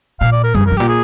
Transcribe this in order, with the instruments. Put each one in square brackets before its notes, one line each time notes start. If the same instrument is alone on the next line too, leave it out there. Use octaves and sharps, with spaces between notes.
[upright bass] A#2 [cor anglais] F5
[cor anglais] D5
A#4
[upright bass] G2 [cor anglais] G#4
[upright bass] F2
[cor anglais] A#4
[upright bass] G2
[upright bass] A#2 [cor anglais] G4
[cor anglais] G#4